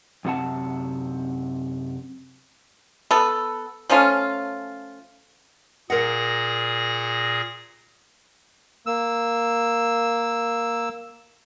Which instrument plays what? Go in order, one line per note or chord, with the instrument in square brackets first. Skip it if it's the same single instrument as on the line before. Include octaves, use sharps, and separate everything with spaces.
[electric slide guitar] F#2 C3 C4 F#5 A5
[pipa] B3 A4
F3 A3 C#4 F4
[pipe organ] A#2 G#4 A#6 [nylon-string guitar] A#4 F#5
[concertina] A#3 E6